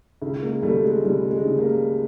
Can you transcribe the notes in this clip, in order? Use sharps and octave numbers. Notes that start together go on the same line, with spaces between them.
C#2
G#3 A#3
C#2 G3 A3
G#3
C#2 G3
G#3
C#3
G#3 A#3